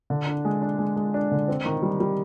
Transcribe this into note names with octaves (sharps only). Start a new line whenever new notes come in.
D3
D4
G#3
D4
G#3
G#3
D4
D3
C4
D#3
G3
G3